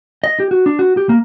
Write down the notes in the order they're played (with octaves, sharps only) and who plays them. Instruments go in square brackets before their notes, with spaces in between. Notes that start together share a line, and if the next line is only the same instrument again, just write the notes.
[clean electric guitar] D#5
G4
F#4
D4
F#4
G4
A#3